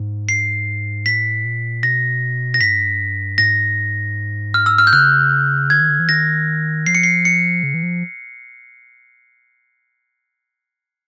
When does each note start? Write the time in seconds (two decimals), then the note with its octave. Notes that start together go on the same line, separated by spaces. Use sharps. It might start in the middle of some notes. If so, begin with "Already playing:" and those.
Already playing: G#2
0.29 C7
1.06 A2 B6
1.45 A#2
1.83 B2 A#6
2.54 A#6
2.61 G2 B6
3.38 G#2 A#6
4.54 F6
4.66 E6
4.78 F6
4.87 G6
4.93 C#3 F#6
5.70 D3 G#6
5.81 D#3
5.89 D3
6.00 E3
6.09 D#3 A#6
6.86 F3 C7
6.95 C#7
7.03 C7
7.25 C#7
7.63 C#3
7.74 E3
7.83 F3